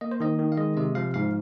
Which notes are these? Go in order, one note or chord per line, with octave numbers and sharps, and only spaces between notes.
A#3 D#5
C5
D#3 D#5
D#3
F5
G#3 D#5
C3 D#5
F3 F5
G#2 F5